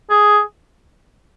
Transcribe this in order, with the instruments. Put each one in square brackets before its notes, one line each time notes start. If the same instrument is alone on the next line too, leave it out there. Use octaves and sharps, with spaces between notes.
[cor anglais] G#4